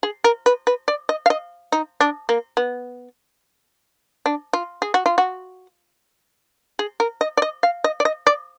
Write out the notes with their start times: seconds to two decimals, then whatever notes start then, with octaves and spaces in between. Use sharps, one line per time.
0.03 G#4
0.24 A#4
0.46 B4
0.67 B4
0.88 D5
1.09 D#5
1.26 F5
1.30 D#5
1.72 D#4
2.00 D4
2.29 A#3
2.57 B3
4.26 D4
4.53 F4
4.82 G#4
4.94 F#4
5.06 F4
5.18 F#4
6.79 G#4
7.00 A#4
7.21 D#5
7.37 D5
7.42 D#5
7.63 F5
7.84 D#5
8.00 D5
8.05 D#5
8.27 D5